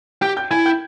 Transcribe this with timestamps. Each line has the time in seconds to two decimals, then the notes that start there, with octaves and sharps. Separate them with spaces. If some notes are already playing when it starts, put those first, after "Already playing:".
0.21 G4 G5 G6
0.37 G5 G6
0.51 E4 G#5 G#6
0.66 G5 G6